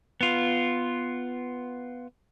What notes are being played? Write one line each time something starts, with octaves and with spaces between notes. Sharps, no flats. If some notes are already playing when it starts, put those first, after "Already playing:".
B3 F4